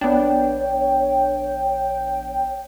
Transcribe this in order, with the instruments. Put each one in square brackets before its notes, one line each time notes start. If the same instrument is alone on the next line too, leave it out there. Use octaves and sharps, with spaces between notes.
[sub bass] A#1 [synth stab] B3 D4 [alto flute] C#5 [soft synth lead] G5